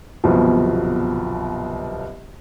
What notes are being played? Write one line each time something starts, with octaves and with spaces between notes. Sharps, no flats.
G1 C2 B2 F3 F#3